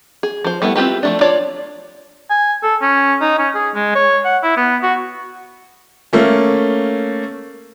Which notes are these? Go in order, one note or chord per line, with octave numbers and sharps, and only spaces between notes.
G#4
F3 C5
G3 A3 B3 E4
C4 E4 F4 G4 B4
F3 A3 D4
D4 F4 C#5 D5
G#5
A4
C#4
D#4
C#4
G#4
G#3
C#5
F#5
E4
B3
F#4
A3 A#3 C#4